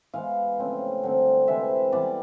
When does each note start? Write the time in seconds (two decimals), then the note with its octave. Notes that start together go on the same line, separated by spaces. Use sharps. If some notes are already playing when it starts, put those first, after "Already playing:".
0.14 E3 G#3 B3 F5
0.59 C#3 F3 A3 C4
1.04 D3 G3 C4
1.48 C3 E3 G#3 E5
1.92 E3 G3 B3 D5